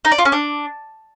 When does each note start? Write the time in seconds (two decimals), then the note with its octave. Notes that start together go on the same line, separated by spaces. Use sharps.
0.05 D#4
0.12 D5
0.18 F4
0.25 C#4
0.32 D4